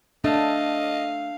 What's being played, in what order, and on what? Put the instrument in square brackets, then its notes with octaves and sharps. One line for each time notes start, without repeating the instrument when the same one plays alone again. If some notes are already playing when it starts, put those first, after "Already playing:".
[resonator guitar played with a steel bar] A3 [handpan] D4 [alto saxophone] D#5 [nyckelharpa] F5